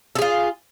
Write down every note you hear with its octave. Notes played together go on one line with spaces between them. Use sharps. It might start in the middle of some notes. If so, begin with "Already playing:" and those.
F4 G#4 A4